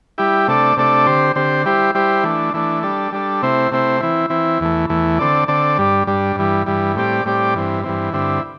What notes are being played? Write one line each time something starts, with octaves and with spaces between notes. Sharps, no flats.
G3 E4 G4
C3 A3 D4 A4 D5
C3 A3 D4 A4 D5
D3 C4 G4 C5
D3 C4 G4 C5
G3 E4 G4 C5
G3 E4 G4 C5
E3 A3 D4
E3 A3 D4
G3 D4 A4
G3 D4 A4
C3 A3 C4 E4 C5
C3 A3 C4 E4 C5
E3 C4 E4
E3 C4 E4
E2 E3 A3
E2 E3 A3
D3 C4 A4 D5
D3 C4 A4 D5
G2 G3 D4
G2 G3 D4
G2 E3 G3
G2 E3 G3
A2 G3 C4 G4 D5
A2 G3 C4 G4 D5
G2 E3 C4
G2 E3 C4
G2 D3 C4 E4